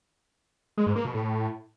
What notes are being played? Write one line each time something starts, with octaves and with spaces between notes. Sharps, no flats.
G#3
G#2
A#3
B2
A2